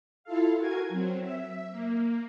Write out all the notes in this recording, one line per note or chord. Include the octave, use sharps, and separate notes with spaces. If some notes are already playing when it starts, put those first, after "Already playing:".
E4 F4 A4 F5
F#4 A#4 G#5 G#6
F#3 C4
E5
A#3